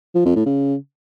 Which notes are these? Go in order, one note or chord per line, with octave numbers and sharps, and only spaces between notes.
F3
F2
A2
C#3